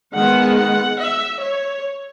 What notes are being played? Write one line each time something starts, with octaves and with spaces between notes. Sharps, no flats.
D#3 G#3 B3 F#5
F#5
E5
C#5